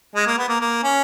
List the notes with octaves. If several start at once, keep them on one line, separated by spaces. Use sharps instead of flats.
G#3
A#3
B3
A#3
A#3
C#4